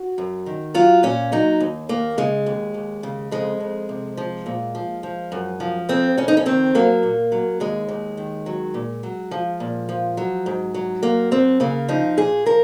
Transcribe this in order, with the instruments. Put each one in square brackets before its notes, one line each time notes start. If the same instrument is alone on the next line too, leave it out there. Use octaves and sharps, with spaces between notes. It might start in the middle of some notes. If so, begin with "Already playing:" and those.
Already playing: [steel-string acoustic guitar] F#4
F#2
D#3
F#3 F4
A#2 C#4
F#3 D#4
D#2
D#2 A#3
C#3 G#3
D#2
D#2
C#3
F2 G#3
F2
C3
F3
A#2
F3
F3
F#2
F3
F2 C4
F2 C#4
D#4
C#4
D#3 C4
F#3 A#3
A#2
F#3
D#2 G#3
D#2
D#3
F#3
A#2
F#3
F3
A#2
F3
F#3
G#2
F#3
F#2 A#3
F#2 C4
C#3 A#3
F3 D#4
A#2 G#4
F3 A#4